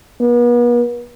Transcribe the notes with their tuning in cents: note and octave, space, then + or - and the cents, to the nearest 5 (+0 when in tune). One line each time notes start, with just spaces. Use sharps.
B3 -40